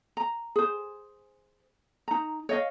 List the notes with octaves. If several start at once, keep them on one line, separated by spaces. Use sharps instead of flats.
A#5
G#4 C5
D#4 A#5
C#5 D#5 F5